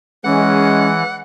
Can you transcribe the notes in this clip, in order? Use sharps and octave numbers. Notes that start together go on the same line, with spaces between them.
E3 G#3 C#4 F#5